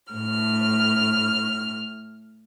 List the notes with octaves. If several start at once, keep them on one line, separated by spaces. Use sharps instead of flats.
A2 F6